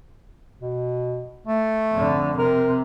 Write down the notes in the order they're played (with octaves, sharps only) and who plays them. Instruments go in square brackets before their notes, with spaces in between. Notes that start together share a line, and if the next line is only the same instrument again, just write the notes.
[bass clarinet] B2
A3
[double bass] F2 D3
[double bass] C3 [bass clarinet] A#4